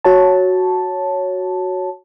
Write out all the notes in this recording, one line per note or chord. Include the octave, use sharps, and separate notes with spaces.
F#4 C#5 A5